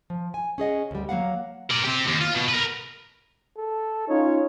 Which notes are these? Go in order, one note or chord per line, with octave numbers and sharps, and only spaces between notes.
F3
G#5
C#4 G#4 D#5 F#5
D2 G3
F#3 A#3 F5 F#5
A#4 D5
C4 G4
D#2
F4
B2
A#4 B4
A4
C#4 D#4 F4 C#5